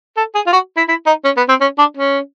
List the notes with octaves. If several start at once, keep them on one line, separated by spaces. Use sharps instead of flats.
A4
G#4
F4
F#4
E4
E4
D#4
C#4
B3
C4
C#4
D4
C#4